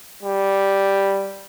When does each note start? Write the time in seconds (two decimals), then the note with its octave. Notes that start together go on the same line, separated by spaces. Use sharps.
0.23 G3